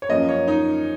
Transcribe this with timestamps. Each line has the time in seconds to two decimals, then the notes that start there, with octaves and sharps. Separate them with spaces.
0.02 C#5
0.09 F#2 F3 A#3 D#5
0.29 C#5
0.48 D#4